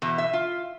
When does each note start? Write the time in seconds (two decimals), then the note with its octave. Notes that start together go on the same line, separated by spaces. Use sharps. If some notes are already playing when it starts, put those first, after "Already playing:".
0.02 E2 B2
0.18 E5
0.33 F4